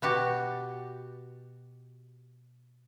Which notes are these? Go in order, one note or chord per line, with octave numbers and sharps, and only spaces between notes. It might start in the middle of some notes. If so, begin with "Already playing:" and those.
B2 F#4 G4 A5